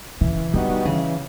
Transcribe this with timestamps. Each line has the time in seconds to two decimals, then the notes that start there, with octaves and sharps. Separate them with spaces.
0.21 C#3 E3
0.54 D3 G3 B3 D#4 F#4
0.85 C#3 E3